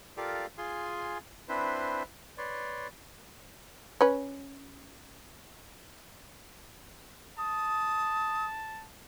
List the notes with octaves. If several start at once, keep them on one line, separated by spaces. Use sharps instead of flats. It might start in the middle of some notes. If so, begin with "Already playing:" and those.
F4 G4 A4 A#4 D5 F5
F4 G#4 G#5 C6
C4 D4 E4 B4 C5
B4 C#5 D5 C6
C#4 B4
A5 D#6